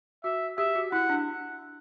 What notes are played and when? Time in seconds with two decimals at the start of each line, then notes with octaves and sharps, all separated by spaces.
0.24 F#4 E5
0.57 G4 E5
0.75 F#4
0.92 E4 F#5
1.10 D4